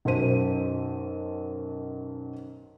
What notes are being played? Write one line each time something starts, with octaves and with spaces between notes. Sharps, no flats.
B1 F#2 C5 D#7